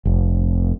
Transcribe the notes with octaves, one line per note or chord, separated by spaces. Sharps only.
F1